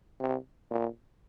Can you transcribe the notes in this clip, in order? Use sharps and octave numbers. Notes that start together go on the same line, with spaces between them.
C3
A#2